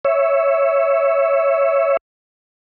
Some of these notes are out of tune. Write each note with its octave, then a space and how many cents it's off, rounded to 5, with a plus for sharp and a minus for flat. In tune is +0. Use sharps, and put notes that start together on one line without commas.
C#5 +5 E5 +0